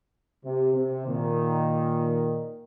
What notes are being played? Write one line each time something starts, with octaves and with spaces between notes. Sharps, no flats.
C3
C3
A#2 D#3